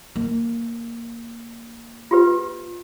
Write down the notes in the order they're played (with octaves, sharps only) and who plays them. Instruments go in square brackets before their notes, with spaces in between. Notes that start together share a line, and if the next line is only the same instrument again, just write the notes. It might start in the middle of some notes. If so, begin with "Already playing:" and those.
[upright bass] A#3
[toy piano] F4 G4 B4